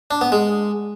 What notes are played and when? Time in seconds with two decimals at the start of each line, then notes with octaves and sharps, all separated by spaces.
0.11 D4
0.21 B3
0.32 G#3